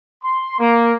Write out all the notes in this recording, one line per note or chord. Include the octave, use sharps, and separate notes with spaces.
C6
A#3